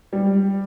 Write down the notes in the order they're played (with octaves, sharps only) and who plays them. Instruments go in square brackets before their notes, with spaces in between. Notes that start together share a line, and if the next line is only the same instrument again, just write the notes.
[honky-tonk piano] G3